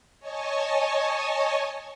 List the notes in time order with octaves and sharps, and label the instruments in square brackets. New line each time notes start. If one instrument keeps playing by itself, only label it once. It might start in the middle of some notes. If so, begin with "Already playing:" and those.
[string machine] C#5 D#5 G#5 A5 C#6